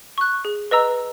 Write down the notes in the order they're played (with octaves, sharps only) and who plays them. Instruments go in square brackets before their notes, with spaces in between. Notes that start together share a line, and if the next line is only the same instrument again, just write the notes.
[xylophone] C#6 F#6
G#4
B4 D#5 A#5 E6